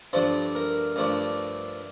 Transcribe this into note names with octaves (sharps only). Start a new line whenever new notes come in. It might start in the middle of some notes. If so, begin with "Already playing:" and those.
G2 F3 A3 D4 C5
A#4
G2 F3 A3 D4